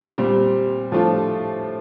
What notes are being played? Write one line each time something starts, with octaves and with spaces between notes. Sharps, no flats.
A#2 G3 C4
A2 F3 A3 D4 F4